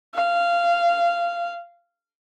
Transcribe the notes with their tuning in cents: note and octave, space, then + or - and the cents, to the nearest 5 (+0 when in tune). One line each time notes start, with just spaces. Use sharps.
F5 -15